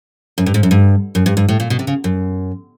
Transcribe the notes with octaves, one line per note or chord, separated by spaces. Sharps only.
F#2
G2
G#2
F#2
G2
F#2
G2
G2
A2
A#2
B2
C3
C#3
F#2